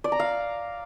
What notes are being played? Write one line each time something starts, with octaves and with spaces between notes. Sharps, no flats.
D5
A#5
F5